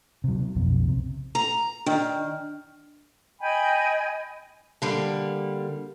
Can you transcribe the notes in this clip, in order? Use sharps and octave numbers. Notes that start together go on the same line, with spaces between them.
C3 F#3
B1 F2 B2
C3
A#5
D#3 D4 F6
D#5 G5 G#5 B5
D3 G3 A#3